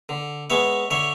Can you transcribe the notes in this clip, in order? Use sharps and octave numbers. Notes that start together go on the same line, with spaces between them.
D3
G#3 B3 C#5 E5
D3 C#5 E5